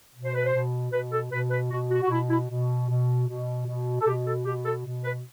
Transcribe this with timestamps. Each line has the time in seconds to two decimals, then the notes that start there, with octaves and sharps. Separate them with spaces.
0.14 B2
0.24 C5
0.35 B4
0.45 C5
0.53 B2
0.91 B2 B4
1.12 A4
1.31 B2 B4
1.51 B4
1.71 B2 F#4
1.91 F#4
2.01 F#4
2.09 B2 E4
2.30 E4
2.49 B2
2.88 B2
3.28 B2
3.67 B2
4.00 A4
4.07 B2 G4
4.26 A4
4.45 B2 G4
4.65 A4
4.85 B2
5.04 B4